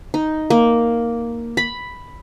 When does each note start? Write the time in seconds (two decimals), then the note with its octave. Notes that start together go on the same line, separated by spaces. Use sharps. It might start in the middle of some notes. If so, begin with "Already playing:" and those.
0.14 D#4
0.50 A#3
1.57 B5